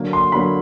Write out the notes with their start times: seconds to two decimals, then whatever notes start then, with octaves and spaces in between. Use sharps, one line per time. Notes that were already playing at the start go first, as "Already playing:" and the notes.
Already playing: D3 F#3 A#3
0.13 C6
0.32 D3 F#3 A#3 B5